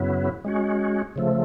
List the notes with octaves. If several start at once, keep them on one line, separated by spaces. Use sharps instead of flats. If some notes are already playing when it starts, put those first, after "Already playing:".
Already playing: F#2 C#3 F#3 B3 E4
G#3 C#4 F#4
C#3 F3 A3